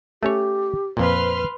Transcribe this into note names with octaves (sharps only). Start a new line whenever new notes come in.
A3 C#4 G4 C#5
F2 A#2 B4 C5 C6 F6